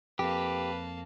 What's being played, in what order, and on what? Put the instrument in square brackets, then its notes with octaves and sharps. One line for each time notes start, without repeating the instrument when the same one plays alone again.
[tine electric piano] F2 [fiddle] A#3 A5 [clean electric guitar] G4 [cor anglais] B4